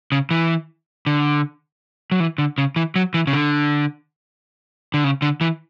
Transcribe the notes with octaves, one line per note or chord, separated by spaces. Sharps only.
C#3
E3
D3
F#3
E3
D3
C#3
E3
F#3
E3
C#3
D3
D3
C#3
D3
E3